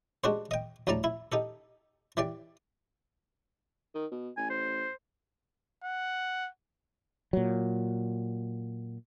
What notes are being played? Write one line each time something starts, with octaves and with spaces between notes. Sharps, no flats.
G#3 D4 F#4 G4 C5
D#5 G5
D2 A2 G3 D5 A5 A#5
E4
D#4 G4 A4
E3 G4 D5 G5
D#3
B2
A1 G#5
C5
F#5
A#2 F#3